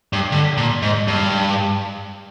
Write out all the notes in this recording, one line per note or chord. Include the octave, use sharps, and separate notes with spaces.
G2
D3
A#2
G#2
G2